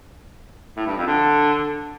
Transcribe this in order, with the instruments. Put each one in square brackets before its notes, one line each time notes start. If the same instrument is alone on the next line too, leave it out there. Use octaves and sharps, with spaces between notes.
[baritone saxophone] A2
G2
F2
D3